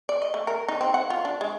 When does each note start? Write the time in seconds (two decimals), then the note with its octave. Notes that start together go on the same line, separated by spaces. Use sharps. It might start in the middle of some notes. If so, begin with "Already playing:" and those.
0.09 D5
0.22 D#5
0.34 A3
0.47 A#4
0.68 D#4
0.81 C4
0.94 F#5
1.10 F4
1.25 D4
1.41 G#3